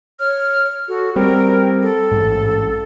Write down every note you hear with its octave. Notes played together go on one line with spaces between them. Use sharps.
C#5 F6
F#4 A4
G3 C4 A#4 G5
A4
A1 G#2